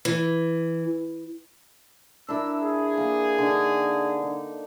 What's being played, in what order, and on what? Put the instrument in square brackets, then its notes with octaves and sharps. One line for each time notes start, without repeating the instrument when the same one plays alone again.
[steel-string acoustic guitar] E3
[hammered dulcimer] D4 E4 A#4 [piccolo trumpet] E6
[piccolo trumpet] G#4
[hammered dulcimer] A#3
D3 D#4
D#4